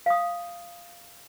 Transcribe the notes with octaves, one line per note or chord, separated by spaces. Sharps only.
F5 D#6